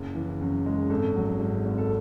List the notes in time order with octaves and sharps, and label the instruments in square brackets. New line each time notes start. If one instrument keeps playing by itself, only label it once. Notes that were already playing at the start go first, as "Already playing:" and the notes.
Already playing: [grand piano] F#1
E3
F#2
G#3
G#1 A4
F#3
G#2
G#1
A4